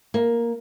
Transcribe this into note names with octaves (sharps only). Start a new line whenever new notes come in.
A#3